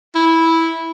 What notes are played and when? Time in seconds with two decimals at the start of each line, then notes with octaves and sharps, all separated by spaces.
0.15 E4